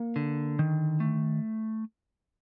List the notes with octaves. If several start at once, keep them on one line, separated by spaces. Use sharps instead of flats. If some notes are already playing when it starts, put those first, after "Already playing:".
Already playing: A#3
D3
D#3
A3